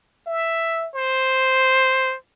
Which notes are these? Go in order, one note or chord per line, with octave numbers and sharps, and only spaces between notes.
E5
C5